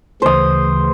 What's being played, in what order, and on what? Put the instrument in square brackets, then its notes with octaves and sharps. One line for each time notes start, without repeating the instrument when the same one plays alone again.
[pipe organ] D2 C#3 E3 [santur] C5 D#6